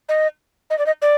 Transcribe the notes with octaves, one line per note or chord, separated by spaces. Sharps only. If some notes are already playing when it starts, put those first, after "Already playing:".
D#5
D#5
D5
D#5
D5